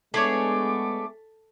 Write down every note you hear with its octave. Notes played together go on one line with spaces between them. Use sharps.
G#3 A3 B3 D4 G#4 C#5 D6